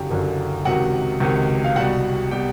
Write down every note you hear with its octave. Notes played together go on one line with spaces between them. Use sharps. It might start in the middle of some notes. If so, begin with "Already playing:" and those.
Already playing: F#1 F#2 D3 F#3 G4 G5
F#1 F#2 D3 F#3
C#2 C3 D#3 F#3 F#4 F#5
C#2 C3 D#3 F#3
F5
C2 B2 G3 F#4 F#5
B2 G3 G4 G5